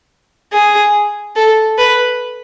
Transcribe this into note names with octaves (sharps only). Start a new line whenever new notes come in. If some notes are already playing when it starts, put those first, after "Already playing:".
G#4
A4
B4